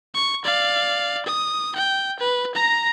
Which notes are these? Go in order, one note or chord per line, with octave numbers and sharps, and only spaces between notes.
C#6
D5 F5
D#6
G5
B4
A#5 A#6